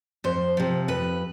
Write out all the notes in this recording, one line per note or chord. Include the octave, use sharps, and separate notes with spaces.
F2 C5
C3 F3
F2 B4